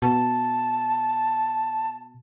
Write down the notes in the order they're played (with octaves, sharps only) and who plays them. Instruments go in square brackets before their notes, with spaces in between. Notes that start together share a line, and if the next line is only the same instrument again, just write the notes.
[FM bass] B2 [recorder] A5